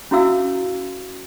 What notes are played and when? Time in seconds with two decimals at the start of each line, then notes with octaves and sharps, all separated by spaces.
0.11 C#4 E4 F#4 E5 F5 E6